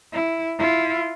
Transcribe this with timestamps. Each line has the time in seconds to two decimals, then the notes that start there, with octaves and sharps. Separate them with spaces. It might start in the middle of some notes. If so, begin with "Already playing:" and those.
0.13 E4
0.59 E4 F4